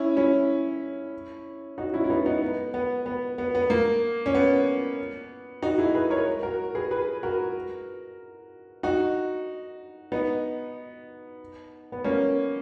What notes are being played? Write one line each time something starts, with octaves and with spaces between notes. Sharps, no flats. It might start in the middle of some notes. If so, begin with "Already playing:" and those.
Already playing: C#4 E4
C#4 E4
D#4 F#4
C#4 E4
E4
B3 D#4
B3 D#4
B3
B3
B3
B3
B3
A#3
C#4
B3
D#4 F#4
E4 G#4
G#4 B4
A#4 C#5
F#4 A#4
G#4 B4
G#4 B4
F#4 A#4
D#4 F#4
B3 D#4
B3
A#3 C#4